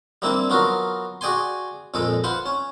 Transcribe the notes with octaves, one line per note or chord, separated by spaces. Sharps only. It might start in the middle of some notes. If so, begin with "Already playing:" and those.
G3 A#3 C4 D4 E4
F#3 B3 F4 F#4 A#4
F#4 G#4 D5 G5 G#5 C6
F2 A#2 G#3 A4
F4 B4 C5 F#5
C#4